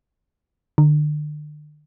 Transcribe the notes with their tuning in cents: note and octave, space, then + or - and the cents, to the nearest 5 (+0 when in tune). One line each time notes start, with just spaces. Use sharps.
D3 +35